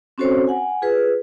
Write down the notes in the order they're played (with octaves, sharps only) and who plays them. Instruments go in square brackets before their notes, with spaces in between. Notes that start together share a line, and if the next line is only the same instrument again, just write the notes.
[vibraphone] C4 C#4 F#4 A4 C5 C#5
F#5 G#5
F4 G#4 B4